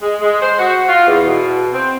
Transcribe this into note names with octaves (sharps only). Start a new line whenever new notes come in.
G#3
G#3
C5
F#4
F4
E2
B2
C4